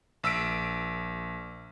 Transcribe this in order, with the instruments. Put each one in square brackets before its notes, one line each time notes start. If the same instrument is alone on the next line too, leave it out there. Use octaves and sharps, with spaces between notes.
[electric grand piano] A#1 E6 B6 D7